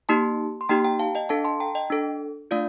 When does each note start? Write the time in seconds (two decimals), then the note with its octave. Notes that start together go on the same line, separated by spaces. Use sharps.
0.09 A#3 D#4 G4 A5 C6
0.61 C6
0.69 A#3 D#4 G4 G5 A#5
0.84 G5 A#5
0.99 F5 A5
1.15 D#5 G5
1.29 D4 A4 F5 A5
1.44 A5 C6
1.60 G5 A#5
1.75 D#5 G5
1.90 D4 A4
2.51 A3 D4 F4 D5 F5